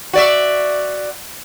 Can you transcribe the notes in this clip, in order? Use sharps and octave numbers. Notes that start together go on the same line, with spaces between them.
F#4 D5 E5